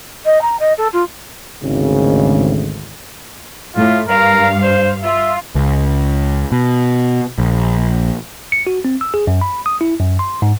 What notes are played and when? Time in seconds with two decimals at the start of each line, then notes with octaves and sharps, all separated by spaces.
0.25 D#5
0.41 A#5
0.59 D#5
0.77 A4
0.93 F4
1.63 G#1 D2 C#3
3.76 A2 F4
4.08 G2 A#4 F5
4.62 C5
5.03 F4 E5
5.55 C#2
6.52 B2
7.38 A#1
8.52 C#7
8.67 F#4
8.85 C4
9.01 E6
9.14 G#4
9.27 F#2
9.41 B5
9.66 D#6
9.81 E4
10.00 F#2
10.19 C6
10.42 G#2